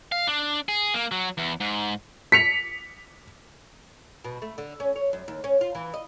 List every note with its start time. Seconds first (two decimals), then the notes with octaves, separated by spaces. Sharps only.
0.12 F5
0.27 D4
0.69 G#4
0.94 A#3
1.12 F#3
1.38 E2
1.60 G#2
2.32 B6 C#7 F7
4.24 B2
4.42 A3
4.58 D3
4.80 C#4
4.96 C#5
5.13 F#2
5.28 D#2
5.44 C#4
5.61 F4
5.75 E3
5.94 D#5